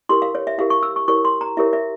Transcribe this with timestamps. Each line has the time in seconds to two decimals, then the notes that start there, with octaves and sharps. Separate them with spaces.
0.09 E4 G4 A#4 C6
0.22 F5
0.35 C#5
0.47 E5
0.58 E4 G4 A#4 F5
0.70 C#6
0.83 E6
0.96 C#6
1.08 E4 G4 A#4 C#5 C#6
1.25 C6
1.41 A#5
1.57 E4 G4 A#4 C#5 E5
1.73 E5